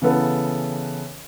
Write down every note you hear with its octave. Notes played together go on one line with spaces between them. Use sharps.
C#3 E3 B3 A4 B4